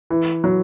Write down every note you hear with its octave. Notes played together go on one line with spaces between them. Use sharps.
E3
F#3